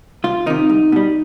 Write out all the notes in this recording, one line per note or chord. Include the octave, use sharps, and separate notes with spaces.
C2 F4
C3 D#3 D#4
C2
B2 G3